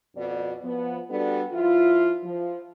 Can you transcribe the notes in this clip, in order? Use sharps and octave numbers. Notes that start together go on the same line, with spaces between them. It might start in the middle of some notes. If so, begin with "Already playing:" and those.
F2 B2 D5
F3 B3
G3 B3 D4 F#4 A4
F3 E4 F4
F3